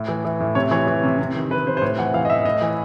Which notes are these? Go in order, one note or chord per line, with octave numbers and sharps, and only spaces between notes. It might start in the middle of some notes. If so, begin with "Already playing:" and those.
Already playing: A2
E3
E3
A2
C3 C#5
E3 C#5
E3
C3
C3
D#3
D#3 B4
C3 C5
C5
A2 C#5
E3 F#5
E3 F5
D#5
A2 E5
A2 D#5
E3